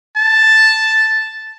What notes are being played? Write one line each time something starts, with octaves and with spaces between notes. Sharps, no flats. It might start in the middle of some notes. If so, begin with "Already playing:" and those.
A5